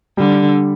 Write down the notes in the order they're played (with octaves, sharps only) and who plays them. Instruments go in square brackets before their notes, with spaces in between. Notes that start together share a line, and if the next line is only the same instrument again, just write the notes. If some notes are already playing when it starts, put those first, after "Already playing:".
[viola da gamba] D3 [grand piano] G3